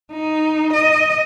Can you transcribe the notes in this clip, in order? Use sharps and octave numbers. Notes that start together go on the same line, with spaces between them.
D#4
D#5